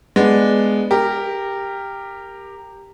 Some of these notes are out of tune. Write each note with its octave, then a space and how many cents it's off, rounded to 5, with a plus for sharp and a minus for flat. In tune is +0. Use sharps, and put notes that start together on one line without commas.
G#3 +0 B3 +0 D4 +0
G4 +10 A#4 -10